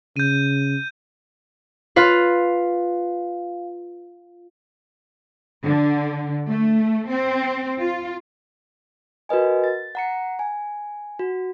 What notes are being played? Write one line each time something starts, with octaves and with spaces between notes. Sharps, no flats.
C#3 G6 D#7
F4 B4 F5
D3
A3
C4
F4
F#4 A#4 B4 D#5 G#5
A6
F#5 A#5 C#7
G#5
F#4